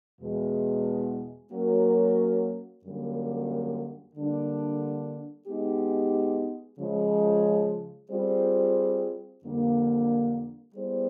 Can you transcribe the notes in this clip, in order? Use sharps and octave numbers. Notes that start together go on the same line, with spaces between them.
E2 B2 G#3
F#3 A#3 C#4 F#4 A#4
F#2 D3 G3 A#3
D3 G3 A#3 D4
G#3 B3 D#4 G4
C#3 F3 G#3
G3 C4 F4 G#4 C5
F2 D3 G3 A#3 D4
G3 B3 E4 G#4 C5